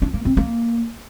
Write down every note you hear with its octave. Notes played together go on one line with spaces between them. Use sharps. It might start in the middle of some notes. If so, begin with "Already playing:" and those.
D4
A#3
C4
A#3